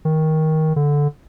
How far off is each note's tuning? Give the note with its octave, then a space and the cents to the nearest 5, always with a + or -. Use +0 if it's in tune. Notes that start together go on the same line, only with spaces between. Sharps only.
D#3 +15
D3 -10